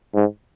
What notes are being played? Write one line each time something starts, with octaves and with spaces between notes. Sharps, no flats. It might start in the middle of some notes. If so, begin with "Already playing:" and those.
G#2